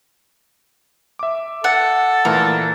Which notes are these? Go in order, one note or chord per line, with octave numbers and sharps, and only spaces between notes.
E5 D6
A4 F#5
A#2 E3 A3 A#4